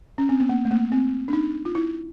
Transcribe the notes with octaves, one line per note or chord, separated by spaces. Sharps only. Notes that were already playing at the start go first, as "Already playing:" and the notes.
C#4
C4
B3
A#3
A3
A#3
C4
D4
D#4
F4
E4